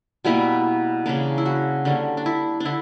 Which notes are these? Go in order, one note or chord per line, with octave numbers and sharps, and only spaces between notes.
B2 G3 A#3 E4
C#3 E3 A#3 D4
E4
F#4
D3 G3 A#3 C#4
D4
E4
D4
D3 E4